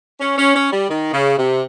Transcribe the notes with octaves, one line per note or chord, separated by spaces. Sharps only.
C#4
C#4
C#4
G3
D#3
C#3
C3